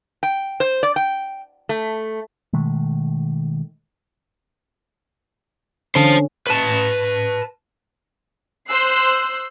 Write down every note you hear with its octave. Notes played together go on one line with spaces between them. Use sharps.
G5
C5
D5
G5
A3
B2 D#3 G#3 A3
D3 C#4 C5 A5
B4 A5
C5 C6 E6 F#6 C7